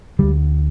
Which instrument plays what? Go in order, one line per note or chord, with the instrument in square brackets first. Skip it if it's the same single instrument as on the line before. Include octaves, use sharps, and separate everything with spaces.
[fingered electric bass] D2 D3 G3